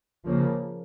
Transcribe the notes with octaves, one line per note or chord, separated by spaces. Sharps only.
C#3 F3 A#3